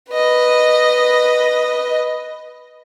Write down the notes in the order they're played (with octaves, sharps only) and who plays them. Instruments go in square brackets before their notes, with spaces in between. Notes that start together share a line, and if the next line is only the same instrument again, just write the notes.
[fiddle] B4 D#5